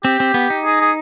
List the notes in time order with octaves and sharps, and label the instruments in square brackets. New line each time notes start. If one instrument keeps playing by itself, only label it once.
[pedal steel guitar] C4 [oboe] G4
[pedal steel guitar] C4
B3
D#4
[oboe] G#4
G#4